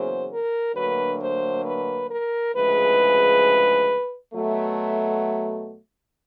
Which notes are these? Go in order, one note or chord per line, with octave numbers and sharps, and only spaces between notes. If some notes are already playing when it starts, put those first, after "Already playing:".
Already playing: E2 C#3 F#3 A#3 C5
A#4
D2 D3 F#3 A#3 B4
C5
B4
A#4
D2 C#3 F3 G#3 B4
B2 F#3 A3